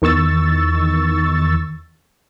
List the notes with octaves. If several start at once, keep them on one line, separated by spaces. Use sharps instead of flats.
E2 D#3 C#6 E6 A6